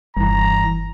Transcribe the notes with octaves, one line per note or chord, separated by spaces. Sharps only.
F#1 G2 E3 A#5